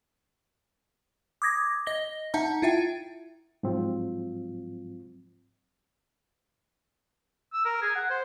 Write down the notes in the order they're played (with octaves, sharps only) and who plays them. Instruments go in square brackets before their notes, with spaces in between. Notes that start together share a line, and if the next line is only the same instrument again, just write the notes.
[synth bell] D6 D#6 G#6 A#6
D#5 A#6 G7
D#4 E5 F#5 A5 A#5
E4 F4 E5 G5
[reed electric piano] G#2 F3 F#3 C4 F4
[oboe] E6
A#4
G#4
F#5
C5